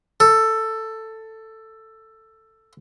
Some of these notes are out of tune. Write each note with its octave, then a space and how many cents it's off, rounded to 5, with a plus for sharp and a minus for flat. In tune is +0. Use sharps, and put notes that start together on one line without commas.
A4 +10